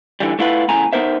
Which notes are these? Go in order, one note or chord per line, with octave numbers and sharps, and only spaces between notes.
D3 E3 G3
A3 E4 F4 B4 F#5
E2 A2 C#3 G#5 A#5
B3 D#4 A#4 C5 E5